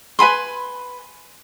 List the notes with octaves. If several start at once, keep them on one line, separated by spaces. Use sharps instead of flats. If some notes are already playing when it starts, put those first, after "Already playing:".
B4 G#5 B5 C6